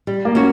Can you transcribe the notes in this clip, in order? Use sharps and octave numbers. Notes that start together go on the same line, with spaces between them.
G3
A#3
C#4 F#4